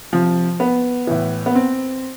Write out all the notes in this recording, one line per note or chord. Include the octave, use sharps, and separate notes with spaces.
C3 F3
B3
A2 E3
B3
C4